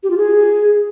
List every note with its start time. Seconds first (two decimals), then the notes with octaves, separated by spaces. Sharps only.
0.03 G4
0.10 F4
0.17 G#4